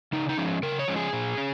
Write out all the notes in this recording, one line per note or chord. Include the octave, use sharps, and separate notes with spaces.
C#3 D#4
D#4
F3 G#3 C#4
C#3 A#4
C#5
F3 G#3 C#4
G#4
A#2
C#4